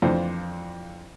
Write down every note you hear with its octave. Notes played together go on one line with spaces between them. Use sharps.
F2 E3 D4 F4 C5